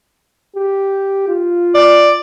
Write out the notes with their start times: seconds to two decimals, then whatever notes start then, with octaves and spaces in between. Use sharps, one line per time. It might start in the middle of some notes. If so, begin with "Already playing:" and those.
0.56 G4
1.29 F4
1.74 D5